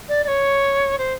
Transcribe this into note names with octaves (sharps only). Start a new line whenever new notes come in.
D5
D5
C#5
C5